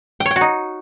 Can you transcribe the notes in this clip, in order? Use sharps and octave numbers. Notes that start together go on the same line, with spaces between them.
G5
C#5
G5
F#4
D#4